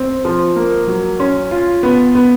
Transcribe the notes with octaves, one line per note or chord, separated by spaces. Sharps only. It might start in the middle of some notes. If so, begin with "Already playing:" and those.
Already playing: C4
F3
A#3
F#3
C#4
F4
B3
B3